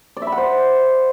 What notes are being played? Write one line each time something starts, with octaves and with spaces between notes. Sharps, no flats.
D5
E5
B5
F#5
C5